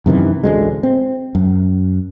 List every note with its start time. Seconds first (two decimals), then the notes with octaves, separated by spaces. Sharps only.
0.06 F#2 C3 D#3 E3
0.44 A1 D2 G#3
0.83 C4
1.35 F#2